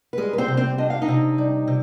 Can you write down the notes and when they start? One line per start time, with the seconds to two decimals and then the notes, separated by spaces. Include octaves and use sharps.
0.13 B4
0.17 G3 G#3 G#4
0.33 B4
0.38 C4 C5
0.48 C3
0.57 C4 C5
0.78 D4 D#5
0.90 F5
1.02 D#4 D#5
1.08 C3
1.38 G3
1.67 C3